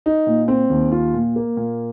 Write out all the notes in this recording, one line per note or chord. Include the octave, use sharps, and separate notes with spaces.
D#4
A#2
C4
D#2
F4
A#2
A#3
A#2